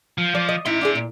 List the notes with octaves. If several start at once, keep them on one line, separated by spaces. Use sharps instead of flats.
F3
F3 D5
D#5
D#4 E4 E5 C6
D4 F#4 G#4
A#2